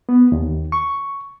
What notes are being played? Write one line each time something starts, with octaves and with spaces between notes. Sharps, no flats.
B3
D#2
C#6